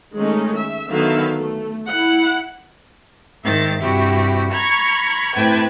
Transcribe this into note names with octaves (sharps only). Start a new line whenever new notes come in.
D#3 G#3 A3 C#4 D#4
E5
D3 D#3 F#3 B3 E5 F5
A3
E4 F#5
G#2 D#3 C5 E5 A6
G2 C3 E4 F#4 G4
A#5 B5 C#6 F6 G#6
A2 C3 B4 G5 A5 G#6